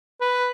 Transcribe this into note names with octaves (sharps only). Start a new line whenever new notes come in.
B4